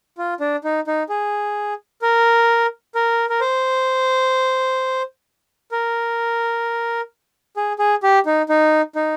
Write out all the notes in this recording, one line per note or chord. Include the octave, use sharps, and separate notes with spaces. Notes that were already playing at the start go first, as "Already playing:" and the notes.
F4
D4
D#4
D#4
G#4
A#4
A#4
A#4
C5
A#4
G#4
G#4
G4
D#4
D#4
D#4